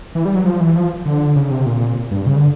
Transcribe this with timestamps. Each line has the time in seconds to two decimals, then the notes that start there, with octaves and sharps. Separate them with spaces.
0.15 E3
0.25 G3
0.35 F#3
0.46 F3
0.60 E3
0.76 F3
1.06 D3
1.36 C#3
1.51 C3
1.66 A#2
2.11 G2
2.27 C#3
2.36 D3